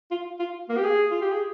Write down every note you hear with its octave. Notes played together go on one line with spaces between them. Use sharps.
F4
F4
A#3
G4
G#4
F4
G4
G#4